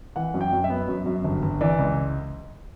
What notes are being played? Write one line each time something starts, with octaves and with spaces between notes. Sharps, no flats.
E3 F#5
F#2
G5
F#2
E5
B3
F#2
F#2
G1
G1
E3 D5
C#2